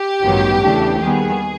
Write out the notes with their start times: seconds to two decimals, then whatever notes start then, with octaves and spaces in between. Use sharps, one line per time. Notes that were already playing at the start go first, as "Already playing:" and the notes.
Already playing: G4
0.24 A1 G2 D#3 F#3 B3
0.63 E2 C#3 E3 A3 D4
1.00 D#2 D#3 G3 B3 G#4